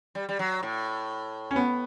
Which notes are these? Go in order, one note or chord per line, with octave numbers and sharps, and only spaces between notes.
G3
G3
F#3
A2
C#4
B3